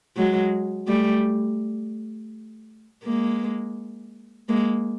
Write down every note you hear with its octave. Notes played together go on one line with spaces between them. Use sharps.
F#3 G#3
G3 A3
G#3 A#3
G#3 A#3